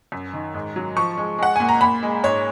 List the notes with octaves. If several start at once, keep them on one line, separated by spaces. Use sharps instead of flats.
F#2
D#3
G#2
F#3
F3 C#6
G#3
G#3 F#5
A#2 G#5
A#5
A#2 B5
G#3
G#2 C#5